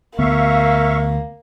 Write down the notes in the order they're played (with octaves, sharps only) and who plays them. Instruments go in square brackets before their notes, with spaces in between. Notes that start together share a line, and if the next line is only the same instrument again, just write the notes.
[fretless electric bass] D2 B3 [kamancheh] A#3 [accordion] E5 F5 C#6